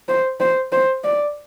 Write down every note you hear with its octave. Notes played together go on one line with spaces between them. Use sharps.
C5
C5
C5
D5